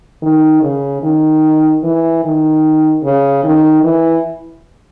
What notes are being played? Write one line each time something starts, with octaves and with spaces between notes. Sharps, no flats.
D#3
C#3
D#3
E3
D#3
C#3
D#3
E3